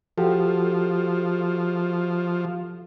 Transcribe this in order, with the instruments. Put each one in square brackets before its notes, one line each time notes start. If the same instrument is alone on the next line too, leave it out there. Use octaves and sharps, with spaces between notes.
[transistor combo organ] F3 [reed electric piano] F#4 G4 A4